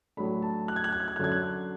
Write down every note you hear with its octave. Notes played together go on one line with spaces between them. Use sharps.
A2 F#3 A3 D4 B5
A5
F#6
G#6
F#6
G#6
F#6
G#6
F#6
F#2 D3 F#3 G#6
F#6